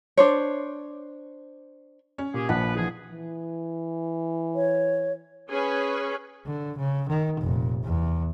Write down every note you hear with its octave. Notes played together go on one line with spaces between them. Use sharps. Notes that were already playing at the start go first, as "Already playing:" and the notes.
D4 C5 C#5
C#4
A#2 G4 G#4
A#1 F3 B4 F#5 A5
E3 F3 G#4
E3
C#5
C#4 G#4 B4 C#5
D3
C#3
D#3
F1 A#2
E2